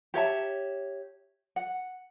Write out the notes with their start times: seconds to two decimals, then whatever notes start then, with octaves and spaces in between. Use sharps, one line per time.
0.14 G4 C#5 E5 A5
1.56 F#5